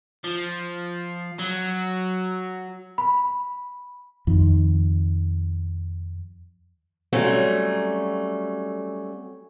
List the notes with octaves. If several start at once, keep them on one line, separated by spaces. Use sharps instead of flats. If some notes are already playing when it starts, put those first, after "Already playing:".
F3
F#3
B5
F2 D#3
F#3 G3 A3 C4 C#4